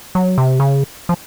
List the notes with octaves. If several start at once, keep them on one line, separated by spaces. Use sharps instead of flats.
F#3
C3
C#3
F3